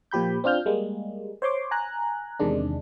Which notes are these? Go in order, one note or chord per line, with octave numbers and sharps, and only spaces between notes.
A#2 F3 G4 B5 G6
C4 D4 F4 F6 G6
G3 G#3 A#3
C5 C#5 C6 D6
G#5 A#5 F#6
E2 C3 D#3 G#3 D4